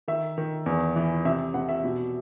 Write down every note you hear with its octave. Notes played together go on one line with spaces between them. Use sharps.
D#3 E5
D#3
E2
E3
C3 E5
C3 F#5
E5
B2